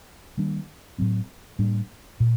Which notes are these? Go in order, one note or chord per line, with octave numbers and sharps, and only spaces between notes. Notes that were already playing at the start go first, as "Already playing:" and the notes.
D#3 G3 A#3 D4
A2 F#3 C4
A2 G3 A#3 D4
A#2